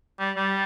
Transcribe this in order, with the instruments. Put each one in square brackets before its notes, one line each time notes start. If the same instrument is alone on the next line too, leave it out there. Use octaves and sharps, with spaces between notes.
[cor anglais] G3
G3